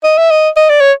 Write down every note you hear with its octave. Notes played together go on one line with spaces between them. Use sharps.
D#5
E5
D#5
D#5
D5
C#5